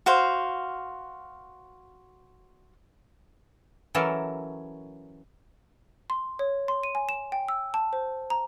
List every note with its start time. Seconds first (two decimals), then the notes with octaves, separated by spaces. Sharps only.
0.06 F#4 C5 F5
3.95 E3 F#3 C#4 A4 A#4 C#5
6.10 C6
6.39 C#5
6.68 C6
6.83 D#7
6.95 G#5
7.09 E7
7.32 G5
7.48 E6
7.74 A5
7.93 C5
8.30 A#5